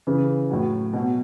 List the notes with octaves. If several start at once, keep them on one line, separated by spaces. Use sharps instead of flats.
C#3 E3
A2 F#3
B2 F#3